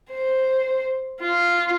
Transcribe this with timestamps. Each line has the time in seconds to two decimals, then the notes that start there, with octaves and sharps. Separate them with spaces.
0.11 C5
1.21 F4